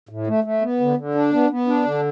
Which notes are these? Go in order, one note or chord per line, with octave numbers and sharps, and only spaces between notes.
A2
A3
A3
B3
D3
D3
D4
B3
B3
D4
D3